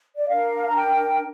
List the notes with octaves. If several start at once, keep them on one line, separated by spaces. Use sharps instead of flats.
D5
D4 A#4 F5
A#5
G5